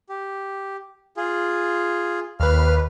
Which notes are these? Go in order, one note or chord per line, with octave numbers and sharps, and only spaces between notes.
G4
F4 G#4
D#2 B4 F5 F6